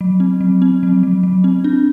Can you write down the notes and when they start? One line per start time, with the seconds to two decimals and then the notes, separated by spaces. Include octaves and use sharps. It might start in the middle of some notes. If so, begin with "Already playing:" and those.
0.01 F#3
0.20 C4
0.41 F#3
0.62 C4
0.83 F#3
1.03 F#3
1.23 F#3
1.44 C4
1.64 D4